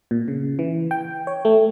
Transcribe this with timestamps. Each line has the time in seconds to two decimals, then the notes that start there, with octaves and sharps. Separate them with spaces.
0.11 A#2
0.28 C#3
0.59 E3
0.91 G5
1.27 C#5
1.45 A3